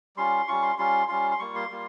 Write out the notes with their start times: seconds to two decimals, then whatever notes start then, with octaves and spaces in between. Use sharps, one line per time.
0.16 G3 C#4 F4 C6
0.48 G3 C#4 F4 C#6
0.62 C6
0.79 G3 C#4 F4 C6
1.09 G3 C#4 F4 C6
1.31 C6
1.39 G3 A#3 F4 C#6
1.55 C6
1.71 G3 A#3 F4